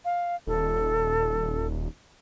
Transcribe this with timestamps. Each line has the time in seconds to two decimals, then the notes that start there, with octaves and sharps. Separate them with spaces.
0.05 F5
0.47 D#1 A4